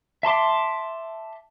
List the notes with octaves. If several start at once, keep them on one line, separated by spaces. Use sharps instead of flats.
E5 A5 C6 D6